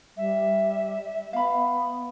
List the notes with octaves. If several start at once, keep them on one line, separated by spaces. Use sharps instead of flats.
G3 E5
B3 F5 B5